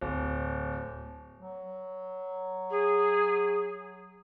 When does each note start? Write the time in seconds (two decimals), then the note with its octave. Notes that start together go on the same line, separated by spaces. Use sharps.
0.01 D1
1.37 F#3
2.70 G#4